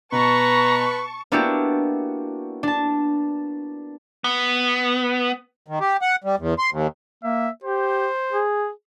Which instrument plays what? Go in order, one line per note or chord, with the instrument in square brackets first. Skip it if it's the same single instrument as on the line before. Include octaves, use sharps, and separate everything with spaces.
[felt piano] B2 [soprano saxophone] B4 [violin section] A5 C#6 [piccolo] A#5
[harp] A#3 B3 D4 E4 F#4 G4
D4 A5
[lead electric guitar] B3
[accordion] D#3
G4
F#5
G3
E2
C6
D#2
[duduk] A#3 [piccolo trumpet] E5
[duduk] G4 [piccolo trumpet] C5
[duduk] G#4